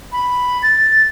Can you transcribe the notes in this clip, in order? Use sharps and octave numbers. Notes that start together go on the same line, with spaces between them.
B5
A6